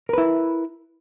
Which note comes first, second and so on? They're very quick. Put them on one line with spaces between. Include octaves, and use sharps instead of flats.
A#4 B4 E4